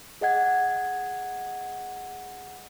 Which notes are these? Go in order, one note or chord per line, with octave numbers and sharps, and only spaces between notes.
G#4 D#5 F#5 G#6